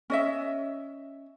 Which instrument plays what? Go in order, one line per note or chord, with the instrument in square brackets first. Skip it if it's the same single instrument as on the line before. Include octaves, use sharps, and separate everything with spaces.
[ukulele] C#4 D#5 E5